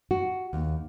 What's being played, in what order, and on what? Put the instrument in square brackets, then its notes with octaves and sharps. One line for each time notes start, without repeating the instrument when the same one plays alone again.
[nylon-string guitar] F#4
D#2